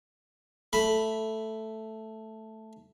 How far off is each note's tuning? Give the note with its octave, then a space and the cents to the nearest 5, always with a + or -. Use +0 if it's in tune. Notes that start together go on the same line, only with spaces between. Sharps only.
A3 +0 B5 +0